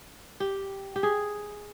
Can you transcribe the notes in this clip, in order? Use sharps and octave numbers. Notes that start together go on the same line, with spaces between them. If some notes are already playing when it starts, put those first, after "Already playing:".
G4
G4
G#4